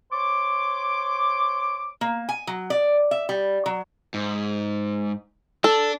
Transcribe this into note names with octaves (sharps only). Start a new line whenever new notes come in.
C5 C#5 D6
A#3
G#5
F#3
D5
E5
G3
F#3
G#2
D4 A4